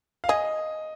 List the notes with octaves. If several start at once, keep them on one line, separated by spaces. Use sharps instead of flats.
F5
G#4 D#5